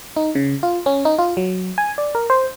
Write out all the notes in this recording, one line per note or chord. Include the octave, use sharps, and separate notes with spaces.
D#4
C#3
F4
C#4
D#4
F4
F#3
G#5
D5
A#4
C5